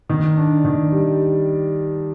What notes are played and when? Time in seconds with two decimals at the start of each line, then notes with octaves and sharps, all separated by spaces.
0.10 D#3
0.37 D4
0.65 D#3
0.92 G3